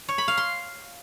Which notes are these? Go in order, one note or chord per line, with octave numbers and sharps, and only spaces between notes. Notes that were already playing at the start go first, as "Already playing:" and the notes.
C#5
B5
F5
C6